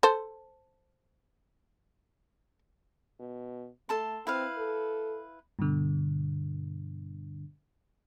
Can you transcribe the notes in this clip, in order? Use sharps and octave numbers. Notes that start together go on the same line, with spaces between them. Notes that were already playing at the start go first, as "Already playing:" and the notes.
A4 C5
B2
A3 A4 A5 C6
C4 E4 B4 F5
A4
G2 B2 D3